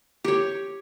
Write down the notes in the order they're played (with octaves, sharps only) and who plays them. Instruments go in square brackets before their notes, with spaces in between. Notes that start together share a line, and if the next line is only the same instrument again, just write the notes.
[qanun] G4 C#5